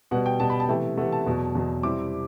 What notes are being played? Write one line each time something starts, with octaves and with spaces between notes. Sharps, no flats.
B2 G3 B3 F#5
G5
B2 G3 B3 A5
B5
A5
C3 E3 A3 G5
C3 E3 A3 F#5
A5
E2 B2 F#3
E2 B2 F#3
C3 G3 C4 E4 D6